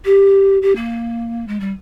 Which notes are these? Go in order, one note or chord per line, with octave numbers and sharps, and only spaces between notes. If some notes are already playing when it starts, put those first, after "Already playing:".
G4
G4
A#3
G#3
G3